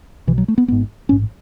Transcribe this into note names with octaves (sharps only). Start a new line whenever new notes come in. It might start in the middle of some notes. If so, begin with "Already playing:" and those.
B1 B2 E3
F#3
A3
B3
G#1 G#2 B3
A1 G#2 C#4